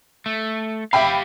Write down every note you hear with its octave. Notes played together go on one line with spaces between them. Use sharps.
A3
G4 E5 F5 G5 B5